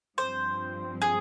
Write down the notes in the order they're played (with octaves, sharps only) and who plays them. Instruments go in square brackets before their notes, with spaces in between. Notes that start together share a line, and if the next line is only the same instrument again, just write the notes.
[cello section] G2 F3 C4 [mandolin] C5
[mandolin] G#4